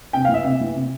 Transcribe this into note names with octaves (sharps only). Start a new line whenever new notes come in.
C3 G5
F5
E3
E5
C3
E3
C3